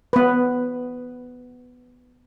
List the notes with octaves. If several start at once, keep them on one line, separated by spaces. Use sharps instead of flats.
B3 B4